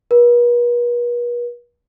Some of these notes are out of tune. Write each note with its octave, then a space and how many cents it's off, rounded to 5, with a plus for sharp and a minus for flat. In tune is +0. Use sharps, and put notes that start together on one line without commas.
B4 -45